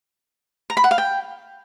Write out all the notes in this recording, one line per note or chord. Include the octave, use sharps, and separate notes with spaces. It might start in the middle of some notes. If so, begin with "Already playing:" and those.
A#5
B5
F#5
F5
G5